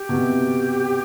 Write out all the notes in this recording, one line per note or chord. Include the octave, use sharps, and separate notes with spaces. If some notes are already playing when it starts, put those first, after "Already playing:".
Already playing: G4
B2
C3